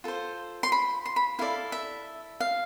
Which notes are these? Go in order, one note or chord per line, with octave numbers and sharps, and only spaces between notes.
F4 A4 C5
C6
B5
C6
B5
E4 A4 D5 F5
E5
F5